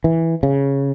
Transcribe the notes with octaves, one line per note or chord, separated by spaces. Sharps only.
E3
C#3